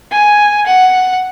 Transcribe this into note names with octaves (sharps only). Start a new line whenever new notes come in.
G#5
F#5